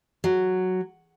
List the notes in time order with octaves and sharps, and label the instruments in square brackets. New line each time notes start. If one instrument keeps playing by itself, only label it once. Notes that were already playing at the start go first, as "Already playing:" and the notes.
[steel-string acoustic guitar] F#3